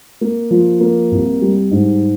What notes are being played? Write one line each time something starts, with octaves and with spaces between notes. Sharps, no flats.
A#3
F3
A#3
C2
G3
G#2